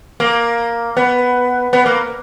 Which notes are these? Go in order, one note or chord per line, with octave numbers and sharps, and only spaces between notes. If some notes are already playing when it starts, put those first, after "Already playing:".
A#3
B3
B3
A#3